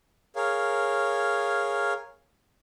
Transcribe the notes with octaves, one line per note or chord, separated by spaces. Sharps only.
G#4 A#4 C#5 F5